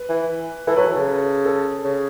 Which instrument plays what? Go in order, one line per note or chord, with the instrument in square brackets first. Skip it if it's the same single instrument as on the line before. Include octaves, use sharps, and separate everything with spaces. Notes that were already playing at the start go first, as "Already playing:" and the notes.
Already playing: [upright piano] B4
[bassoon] E3
[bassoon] E3 [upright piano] A4
[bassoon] F#3 [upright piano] B4
[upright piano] A4
[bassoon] C#3
[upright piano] A4
[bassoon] C#3